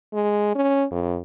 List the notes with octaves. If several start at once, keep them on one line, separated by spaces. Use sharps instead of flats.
G#3
C#4
F2